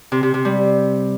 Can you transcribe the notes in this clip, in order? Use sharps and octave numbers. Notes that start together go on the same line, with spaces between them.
C3
C3
C3
G3